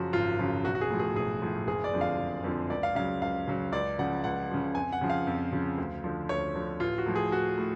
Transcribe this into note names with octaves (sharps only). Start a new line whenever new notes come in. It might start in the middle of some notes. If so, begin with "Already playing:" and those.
Already playing: F#2 C#3 F3 F#4
G#1 F4
F#2 C#3 F3
B1 F#4
F#4
G#4
A2 F3
G#4
B1 G#4
A2 F3
F#1 G#4
D5
F2 D3 F3
F5
F#1
F2 D3 F3
C#2 D5
F5
C#3 F#3 F5
C#2 F5
C#3 F#3
C#2 D5
C#3 F3 F#5
C#2 F#5
C#3 F3
F2 G#5
F#5
C#3 F3
F5
F2
C#3 F3
D2
D3 F3
D2 C#5
D3 F3
A1 F4
F#4
A2 F3
G#4
A1 F#4
A2